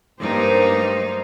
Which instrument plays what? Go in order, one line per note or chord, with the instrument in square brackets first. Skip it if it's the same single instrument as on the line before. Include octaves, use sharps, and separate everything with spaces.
[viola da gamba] G2 A#3 D#4 [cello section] G4 A#4 C5
[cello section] F#3 A3 C5